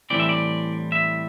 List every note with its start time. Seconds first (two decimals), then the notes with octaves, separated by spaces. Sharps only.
0.10 A2 E3 G3 C4 D5
0.20 E5
0.29 D5
0.92 E5